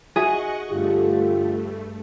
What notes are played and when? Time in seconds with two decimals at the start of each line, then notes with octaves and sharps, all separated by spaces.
0.16 F#4 G#4 D#5 E5 F#5 G#5 C#6
0.69 G2 D3 A3 F4 G4